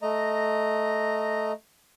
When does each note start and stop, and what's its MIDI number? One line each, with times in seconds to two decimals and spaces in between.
0.02 1.52 57
0.02 1.52 75
0.02 1.52 82